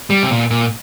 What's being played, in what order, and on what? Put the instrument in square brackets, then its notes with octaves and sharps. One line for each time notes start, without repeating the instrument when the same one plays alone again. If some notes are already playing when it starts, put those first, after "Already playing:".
[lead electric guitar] G3
C3
A#2
A#2